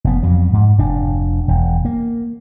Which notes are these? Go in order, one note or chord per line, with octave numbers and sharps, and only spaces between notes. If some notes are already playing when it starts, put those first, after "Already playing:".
F1 B3
F2 F#3
G#2
F1 D4
E1
A#3